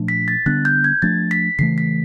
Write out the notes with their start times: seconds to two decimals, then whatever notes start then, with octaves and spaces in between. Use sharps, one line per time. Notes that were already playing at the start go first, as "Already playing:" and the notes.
Already playing: A#2 F3 A3 D4
0.08 B6
0.28 A6
0.46 D3 G3 B3 D4 F#6
0.65 G6
0.84 G#6
1.02 F3 A3 D4 A6
1.31 B6
1.59 C#3 E3 A3 C7
1.78 B6